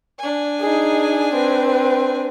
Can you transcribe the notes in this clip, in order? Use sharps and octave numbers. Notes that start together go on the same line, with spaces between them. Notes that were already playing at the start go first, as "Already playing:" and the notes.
D4 G#5
D#4 G#4
C4 B4